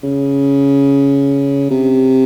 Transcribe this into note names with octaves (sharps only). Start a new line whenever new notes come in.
C#3
C3